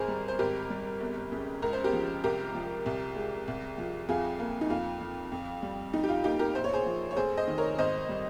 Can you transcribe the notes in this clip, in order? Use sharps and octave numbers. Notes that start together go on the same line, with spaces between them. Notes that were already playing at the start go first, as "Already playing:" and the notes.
Already playing: G#1 G#4 A#4 C5
G3
C5
G#1 G4 A#4
G3
G1
C#3
C#2 A#4
C5
G4 A#4
F3
C2 G4 A#4
F3
C2
G#3
C2
F3
F2 F4 G#4
A#3
D#4
F2 F4
F3
F2
G3
F2 D#4
G4
F4
A#3 D#4 G4
G4 A#4
A#1 C5
C#5
G#4 C5
F3
C#5
F1 G#4 C5
C5 D#5
D#3
A#4 C#5
G#1 C5 D#5
G3